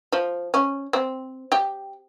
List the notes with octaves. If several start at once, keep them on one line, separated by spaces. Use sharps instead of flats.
F3
C#4
C4
G4